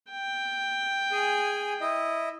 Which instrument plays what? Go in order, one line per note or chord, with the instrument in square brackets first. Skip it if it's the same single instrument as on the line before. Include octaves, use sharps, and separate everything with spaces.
[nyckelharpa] G5
[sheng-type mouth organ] G#4 G#5
E4 D#5